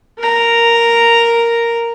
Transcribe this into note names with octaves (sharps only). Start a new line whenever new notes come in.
A#4 A#5